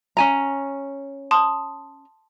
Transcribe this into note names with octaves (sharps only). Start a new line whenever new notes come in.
C#4 G#5 A#5
A5 C6 D#6